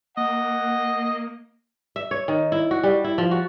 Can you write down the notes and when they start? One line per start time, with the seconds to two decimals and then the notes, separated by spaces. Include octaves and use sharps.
0.17 A#3 D#5 F#5
1.96 E5
2.11 C#5
2.28 D#3
2.52 E4
2.71 F#4
2.83 G3
3.04 E4
3.18 F3
3.31 F#4